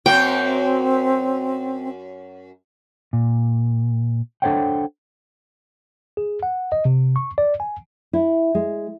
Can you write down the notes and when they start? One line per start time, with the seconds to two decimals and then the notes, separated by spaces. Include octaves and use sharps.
0.06 F#2 A#3 C4 F#4 G5
3.13 A#2
4.42 D4 A4 C5 C#5 F#5 G5
6.17 G#4
6.43 F#5
6.72 D#5
6.85 C3
7.16 C#6
7.38 D5
7.60 G#5
8.13 E4
8.55 G#3